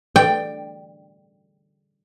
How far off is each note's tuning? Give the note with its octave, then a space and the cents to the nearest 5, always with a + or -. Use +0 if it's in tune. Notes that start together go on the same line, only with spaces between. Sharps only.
D5 +15 G5 +0